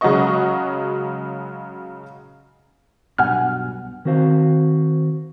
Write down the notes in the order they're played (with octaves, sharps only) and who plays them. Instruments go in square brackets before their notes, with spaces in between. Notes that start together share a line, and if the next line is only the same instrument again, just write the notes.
[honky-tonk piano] C#3 F#3 G#3 F#4 D#5 C#6
[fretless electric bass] B1 G2 B2 [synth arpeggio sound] F#5 G#5 F6
[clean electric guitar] D#3 C4 F#4 C5 F5